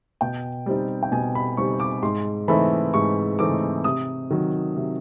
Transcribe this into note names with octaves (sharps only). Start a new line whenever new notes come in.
B2 G5
G3 C4 D#4
G5
B2 G#5
B5
G3 C4 D#4 C#6
D6
G#2 C6
E3 A3 C4 D#4 B5
G#2 C#6
E3 A3 C4 D#4 D6
C3 D#6
D#3 F#3
C3